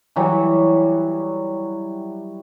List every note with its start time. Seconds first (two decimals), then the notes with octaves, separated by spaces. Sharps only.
0.16 E3 F#3 G3